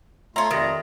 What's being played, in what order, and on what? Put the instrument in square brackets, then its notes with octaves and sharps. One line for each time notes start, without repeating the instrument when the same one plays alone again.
[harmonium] A3 F4 [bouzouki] C#5 A#5 [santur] E5 [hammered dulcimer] C6
[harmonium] F2 A#5 [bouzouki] D#3 [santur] G3 D#6